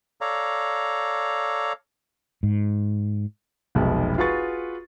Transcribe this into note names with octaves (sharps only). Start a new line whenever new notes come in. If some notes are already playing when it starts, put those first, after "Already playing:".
A4 C#5 D5 F5 A#5
G#2
F1 B1 B2 G#3
F4 F#4 G#4 B4 C#6 A6